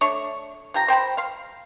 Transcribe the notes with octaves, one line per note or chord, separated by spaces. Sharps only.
A3 D4 C#5 C#6
F3 G4 A#5
C5 G5 A5 B5
F5 C6